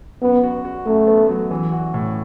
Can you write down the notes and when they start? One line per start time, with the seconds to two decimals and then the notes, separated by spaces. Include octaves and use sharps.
0.22 F#2 B3
0.43 F#4
0.65 F#4
0.86 F#2 A3
1.07 B3
1.29 F#3
1.51 E3
1.72 F#4
1.94 A2